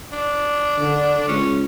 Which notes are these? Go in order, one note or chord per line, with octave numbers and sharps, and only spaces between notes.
D4
D3
C#2 C#4